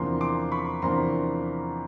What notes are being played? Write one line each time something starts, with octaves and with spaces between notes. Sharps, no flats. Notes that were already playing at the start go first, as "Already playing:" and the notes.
Already playing: E2 C3 F3 A#3 D4 A#5 C6
C6 D6
B5 C#6
E2 C3 F3 A#3 D4 A#5 C6